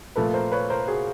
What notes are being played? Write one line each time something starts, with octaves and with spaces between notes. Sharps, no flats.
A#2 F3 A3 A4 B4
A#4 C5
B4 C#5
A#4 C5
F#4 G#4